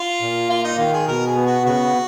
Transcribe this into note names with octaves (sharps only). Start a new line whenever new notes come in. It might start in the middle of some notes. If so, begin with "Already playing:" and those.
Already playing: F4
A#2
A#3 F4
D#4
D#3 F4
G#4
B2 A#4
G#4
B3
F#4
C#3 F#4